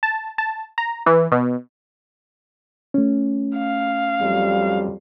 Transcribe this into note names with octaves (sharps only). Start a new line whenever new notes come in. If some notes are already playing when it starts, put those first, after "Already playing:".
A5
A5
A#5
E3
B2
A3 C#4
F5
F2 F#3 G3